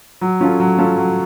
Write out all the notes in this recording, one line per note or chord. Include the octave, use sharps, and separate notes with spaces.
F#3
C#4 F4 A4
F#3
C#4 F4 A4
F#3